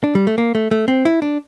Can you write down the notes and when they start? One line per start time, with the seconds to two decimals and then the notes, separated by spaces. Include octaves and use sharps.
0.04 D4
0.15 G3
0.27 A3
0.38 A#3
0.55 A3
0.71 A3
0.88 C4
1.05 E4
1.22 D4